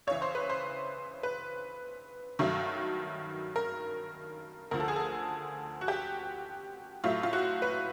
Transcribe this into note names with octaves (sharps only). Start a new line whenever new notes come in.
C#2 C#3 E3 C#5
C5
B4
C5
B4
G2 D#3 F#3 A3
A#4
D2 D3 F3 A#4
A4
G#4
A4
F#4
G4
A2 F#3 A3 F4
F4
F#4
B4